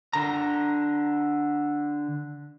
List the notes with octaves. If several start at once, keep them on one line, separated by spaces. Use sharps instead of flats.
D3 A#5